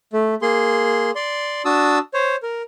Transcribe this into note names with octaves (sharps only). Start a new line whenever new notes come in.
A3
A#3 G#4 C6
D5 C6
D4 F#4 A5 D#6 E6
C5 C#5
A#4